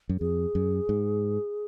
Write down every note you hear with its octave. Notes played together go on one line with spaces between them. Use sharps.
F#2
F2 G#4
F#2
G#2